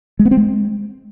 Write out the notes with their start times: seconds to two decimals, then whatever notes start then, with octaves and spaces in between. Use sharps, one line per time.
0.19 G#3
0.25 B3
0.31 C4
0.37 G#3